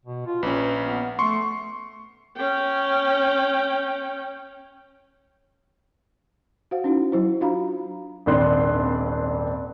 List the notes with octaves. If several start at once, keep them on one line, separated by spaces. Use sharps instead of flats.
B2
F4
A#1 C#4 B4
B3
A3 C6 C#6
C#4 G5
F#4 C5 F5 F#5
C#4 D#4 E4 F#4
F#3 E4 C5
D4 F4 F#4 F5 A#5 B5
D#1 G#1 C4 D4 C6 F#6